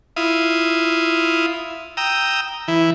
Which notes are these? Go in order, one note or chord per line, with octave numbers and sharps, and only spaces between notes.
E4 F4 D#6
G5 A#5 D#6 E6
E3 E4